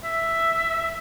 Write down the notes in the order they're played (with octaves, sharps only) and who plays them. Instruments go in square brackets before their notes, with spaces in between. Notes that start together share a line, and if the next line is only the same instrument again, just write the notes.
[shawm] E5